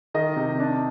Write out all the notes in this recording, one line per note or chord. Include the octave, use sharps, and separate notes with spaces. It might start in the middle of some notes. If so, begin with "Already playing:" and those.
D#3 D#5
C3
D4